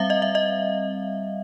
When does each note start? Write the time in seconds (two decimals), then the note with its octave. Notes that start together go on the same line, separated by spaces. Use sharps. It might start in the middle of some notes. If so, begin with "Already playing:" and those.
Already playing: G3 C4 E5 F5
0.10 D#5
0.22 E5
0.35 D#5